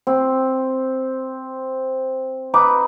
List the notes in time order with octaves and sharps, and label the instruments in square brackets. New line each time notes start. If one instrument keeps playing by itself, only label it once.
[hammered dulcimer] C4
D#4 B4 D6